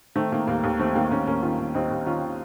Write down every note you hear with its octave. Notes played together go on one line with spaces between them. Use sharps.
D#3 A3 C4
D#3 A#3
D#2 A#3
D#2
D#3 A3 C4
D#3 A#3
D#2 A#3 C#4
D#2 A#3 C#4
D#3 C#4 F4
D#3
D#2 C4 D#4
D#2
D#3 C#4 F4
D#3